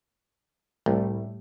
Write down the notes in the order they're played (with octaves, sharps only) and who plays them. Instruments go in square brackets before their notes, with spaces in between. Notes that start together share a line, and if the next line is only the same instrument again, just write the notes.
[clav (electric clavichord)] C2 [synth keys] A2 G3 A3